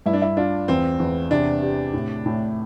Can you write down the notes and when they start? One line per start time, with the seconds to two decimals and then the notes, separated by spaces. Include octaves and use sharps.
0.06 G2 E4
0.13 D4
0.22 E4
0.37 D4 F4
0.68 E2 C4
1.00 E2
1.31 C3 D4
1.62 G4
1.93 A2
2.26 A2